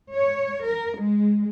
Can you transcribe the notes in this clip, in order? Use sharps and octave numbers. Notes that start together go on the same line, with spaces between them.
C#5
A#4
G#3